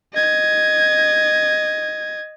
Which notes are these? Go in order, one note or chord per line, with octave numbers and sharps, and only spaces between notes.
D#5 G#6